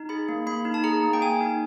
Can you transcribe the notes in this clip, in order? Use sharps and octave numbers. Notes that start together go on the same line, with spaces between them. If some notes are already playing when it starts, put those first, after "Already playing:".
Already playing: D#4
G#4 B5
A#3
A#3 B5
D#4
A5
G#4 A#5
A#3
G5
A#3 G#5
D#4